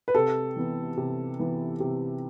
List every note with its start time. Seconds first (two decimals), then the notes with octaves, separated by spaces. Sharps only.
0.08 B4
0.15 C3 A4
0.56 E3 B3
0.97 C3
1.39 E3 B3
1.80 C3